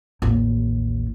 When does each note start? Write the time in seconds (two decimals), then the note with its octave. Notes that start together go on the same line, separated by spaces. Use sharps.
0.22 A1 D#2